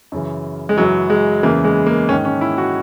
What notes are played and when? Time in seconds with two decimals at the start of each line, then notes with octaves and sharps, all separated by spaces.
0.12 F#2 C#3 E3
0.69 G#3
0.77 F#2 C#3 E3 F#3
1.10 G#3
1.43 E2 C#3 E3 A#3
1.65 G#3
1.87 A#3
2.09 G#2 D#3 C#4
2.25 C#4
2.41 E4
2.58 F#4